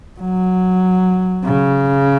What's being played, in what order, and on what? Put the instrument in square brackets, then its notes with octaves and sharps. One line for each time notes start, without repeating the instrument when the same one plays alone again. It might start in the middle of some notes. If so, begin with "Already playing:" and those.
[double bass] F#3
C#3